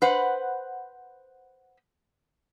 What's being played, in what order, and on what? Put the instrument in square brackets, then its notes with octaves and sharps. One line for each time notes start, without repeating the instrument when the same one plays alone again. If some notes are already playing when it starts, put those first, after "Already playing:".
[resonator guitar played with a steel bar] B4 C5 F#5